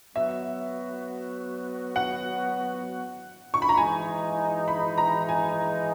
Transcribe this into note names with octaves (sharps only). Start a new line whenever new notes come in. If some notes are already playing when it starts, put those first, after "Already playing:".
F#3 B3 F#4 E5
F#5
C#6
B5
A#5
E3 G#3 D#4 G#5
B5
A#5
G#5